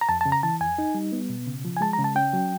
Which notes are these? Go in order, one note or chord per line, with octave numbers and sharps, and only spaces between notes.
A#5
F2 A5
A5
C#3
A#5
E3 A5
F2 G#5
D#4
G3
B3
B2
C#3
F3
G#5
G#3 A5
A#5
C#3
A5
C#4 G5
F#3